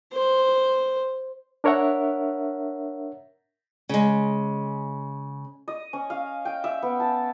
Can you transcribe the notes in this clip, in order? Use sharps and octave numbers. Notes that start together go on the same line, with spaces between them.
C5
D4 A#4 C#5 E5 F#5
C#3 G#3
D#5
C#4
F5
G5
E5
B3
A5